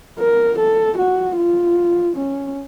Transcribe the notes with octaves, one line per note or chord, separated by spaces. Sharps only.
A#4
A4
F#4
F4
C#4